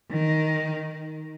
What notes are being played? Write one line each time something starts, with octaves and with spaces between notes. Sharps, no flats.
D#3